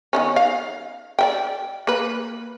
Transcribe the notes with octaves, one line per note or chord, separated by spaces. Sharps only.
D#3 B3 C#4
F5
D5 E5 G5
A#3 B4